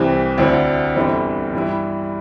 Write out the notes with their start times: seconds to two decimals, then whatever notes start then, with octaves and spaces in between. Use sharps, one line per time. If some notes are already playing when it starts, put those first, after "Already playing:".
Already playing: C2 C3 E3 C4
0.38 D2 D3 C4 E4
0.95 G1 G2 E3 C4
1.53 G2 E3 G3 E4